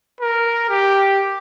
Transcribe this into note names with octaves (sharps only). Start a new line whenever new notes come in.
A#4
G4